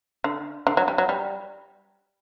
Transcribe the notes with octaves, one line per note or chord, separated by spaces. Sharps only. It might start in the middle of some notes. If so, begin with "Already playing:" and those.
D3
D3
F#3
G3
F#3
G3